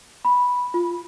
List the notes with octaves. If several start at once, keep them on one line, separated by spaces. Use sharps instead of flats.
B5
F4